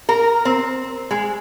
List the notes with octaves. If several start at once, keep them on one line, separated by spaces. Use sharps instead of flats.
A#4
C4
G#3